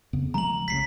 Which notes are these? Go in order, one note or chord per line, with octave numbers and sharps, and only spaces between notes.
F2 C#3 B3
F3 G#3 A3 A#5 F#7
A#1 C#3 B6 C7